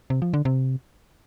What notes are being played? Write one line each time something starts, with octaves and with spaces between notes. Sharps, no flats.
C3
F3
D3
C3